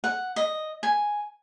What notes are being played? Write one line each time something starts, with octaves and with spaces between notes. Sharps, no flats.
F#5
D#5
G#5